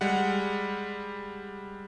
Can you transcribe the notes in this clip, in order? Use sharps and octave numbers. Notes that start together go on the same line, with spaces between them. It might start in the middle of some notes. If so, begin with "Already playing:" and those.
G3 G#3 F#5